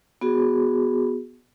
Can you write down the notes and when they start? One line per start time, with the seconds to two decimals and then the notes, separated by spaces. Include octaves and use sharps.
0.21 B3 F#4 G#4